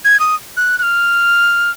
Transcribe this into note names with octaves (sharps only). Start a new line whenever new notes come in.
G#6
D#6
F#6
F#6
F6